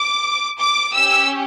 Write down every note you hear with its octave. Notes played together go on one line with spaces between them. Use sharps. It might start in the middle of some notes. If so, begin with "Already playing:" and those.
Already playing: D6
D6
C#4 G4 E6